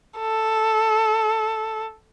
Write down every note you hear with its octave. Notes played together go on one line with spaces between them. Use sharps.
A4